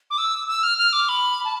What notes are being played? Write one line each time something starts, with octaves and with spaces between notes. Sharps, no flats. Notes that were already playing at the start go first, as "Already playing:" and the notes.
D6
E6
E6
F6
F6
D6
B5
A5